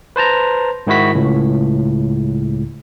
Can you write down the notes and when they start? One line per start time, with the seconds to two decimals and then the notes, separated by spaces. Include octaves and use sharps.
0.16 B4 C5 A5 A#5
0.87 G#2 D#3 E4 F#4 B6
1.15 C#2 A2